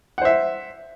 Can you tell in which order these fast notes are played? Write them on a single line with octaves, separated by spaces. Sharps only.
F#5 C5 E5